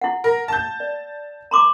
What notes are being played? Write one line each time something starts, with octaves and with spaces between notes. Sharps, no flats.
E4 F#5
A#4
A5 G6
D5
A#5 C6 D6